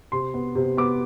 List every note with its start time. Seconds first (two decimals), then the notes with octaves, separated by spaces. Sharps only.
0.12 C3 C6
0.34 B3
0.55 C3
0.77 B3 D6